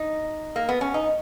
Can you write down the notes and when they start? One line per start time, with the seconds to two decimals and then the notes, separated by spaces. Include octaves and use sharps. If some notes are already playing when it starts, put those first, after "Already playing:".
Already playing: D#4
0.56 A#3
0.69 B3
0.81 C#4
0.94 D#4